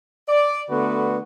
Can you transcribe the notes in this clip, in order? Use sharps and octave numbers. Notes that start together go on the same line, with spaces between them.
D5
D3 A3 B3 F#4 B4